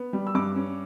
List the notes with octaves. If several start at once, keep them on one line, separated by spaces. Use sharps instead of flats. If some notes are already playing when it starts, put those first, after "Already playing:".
Already playing: B3
G3
E6
G2 D6
C#4